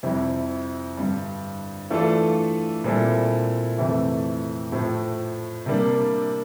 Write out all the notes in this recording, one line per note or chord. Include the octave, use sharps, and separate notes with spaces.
F2 C3 G3 C4 E4
G2 D3 G3
E3 A3 D4 F4 A4
A#2 G3 C4 E4 A4
F2 C3 E3 A3
A2 F3 A3
C3 G3 A#3 D4